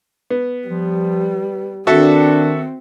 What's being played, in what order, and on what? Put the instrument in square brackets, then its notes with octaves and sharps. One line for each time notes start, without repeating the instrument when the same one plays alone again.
[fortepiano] B3
[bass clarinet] F3 [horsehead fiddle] G3
[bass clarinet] D#3 [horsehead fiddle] C4 [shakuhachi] D4 [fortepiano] F#4 A4 E5